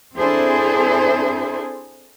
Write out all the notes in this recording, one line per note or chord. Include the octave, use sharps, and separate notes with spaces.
C4 D4 E4 G#4 A4 C5